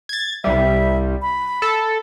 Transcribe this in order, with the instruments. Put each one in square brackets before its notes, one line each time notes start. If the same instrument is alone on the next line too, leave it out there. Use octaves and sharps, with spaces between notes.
[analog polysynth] G#6 A6
[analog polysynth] C2 G3 [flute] E5
[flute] B5
[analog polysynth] A4